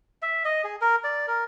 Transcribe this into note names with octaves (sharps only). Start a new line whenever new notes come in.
E5
D#5
G#4
A#4
D5
A#4